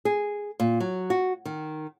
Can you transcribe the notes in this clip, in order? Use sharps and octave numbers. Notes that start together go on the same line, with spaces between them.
G#4
A#2
F#3
F#4
D#3